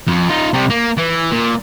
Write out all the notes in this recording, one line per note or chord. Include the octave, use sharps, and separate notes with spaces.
F2
D#4 F4
C3 G3
A#3
E3
A#2